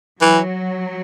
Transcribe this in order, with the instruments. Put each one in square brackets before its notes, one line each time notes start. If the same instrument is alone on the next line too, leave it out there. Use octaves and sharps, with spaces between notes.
[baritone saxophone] E3 [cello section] F#3